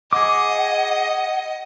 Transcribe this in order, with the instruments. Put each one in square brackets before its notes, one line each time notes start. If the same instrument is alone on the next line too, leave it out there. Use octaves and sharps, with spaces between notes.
[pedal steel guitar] G#4 D6 [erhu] D#5 [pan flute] F#5